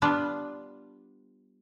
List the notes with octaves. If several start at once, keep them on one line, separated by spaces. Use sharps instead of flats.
G3 B3 D4 F4